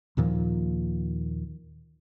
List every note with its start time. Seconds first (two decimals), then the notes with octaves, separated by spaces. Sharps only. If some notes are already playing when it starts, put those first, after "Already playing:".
0.17 D#2 A#2 D#3 F3